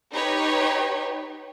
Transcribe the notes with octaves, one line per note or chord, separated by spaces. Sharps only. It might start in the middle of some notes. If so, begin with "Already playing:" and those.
D#4 G4 B4 C#5